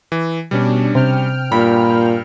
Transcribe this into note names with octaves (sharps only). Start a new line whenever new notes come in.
E3
B2 G3 C#4 D4
C3 G5 F6
G2 A#2 B5